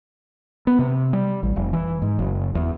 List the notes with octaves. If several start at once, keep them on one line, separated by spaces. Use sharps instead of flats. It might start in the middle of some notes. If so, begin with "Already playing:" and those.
B3
C3
G3
A1
F1
E3
G#2
F#1
E2